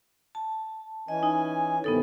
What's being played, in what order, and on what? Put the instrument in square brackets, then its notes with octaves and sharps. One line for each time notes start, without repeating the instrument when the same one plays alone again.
[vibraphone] A5
[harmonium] E3 C#4 G#5 [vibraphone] D#5
[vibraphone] D#4
[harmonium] G2 C3 D#3 [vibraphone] B3 D#4 A4